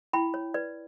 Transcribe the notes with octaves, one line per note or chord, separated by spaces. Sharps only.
E4 G5 B5
C#5
B4 D5